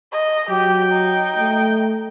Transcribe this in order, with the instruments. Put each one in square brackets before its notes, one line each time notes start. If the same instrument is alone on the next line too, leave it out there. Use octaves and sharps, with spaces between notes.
[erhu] D#5
[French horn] F#3 [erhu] G4 [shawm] G5
[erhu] D#4
[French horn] A3